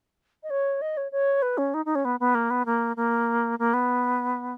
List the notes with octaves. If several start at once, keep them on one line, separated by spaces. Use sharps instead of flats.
D#5
C#5
D#5
C#5
C#5
B4
C#4
D#4
D#4
C#4
B3
B3
A#3
B3
A#3
A#3
A#3
B3